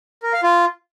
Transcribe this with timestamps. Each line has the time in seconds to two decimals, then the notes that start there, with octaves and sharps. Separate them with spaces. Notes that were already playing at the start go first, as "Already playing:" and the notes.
0.23 A#4
0.33 F5
0.43 F4